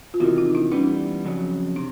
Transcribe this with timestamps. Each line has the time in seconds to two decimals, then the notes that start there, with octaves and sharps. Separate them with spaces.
0.14 F4
0.20 E2 C3 D#3 E4 F#4
0.37 D#4 F4
0.55 D4 E4
0.72 E3 G3 B3 C#4 D#4
1.25 F2 C#3 F#3
1.76 C3 D4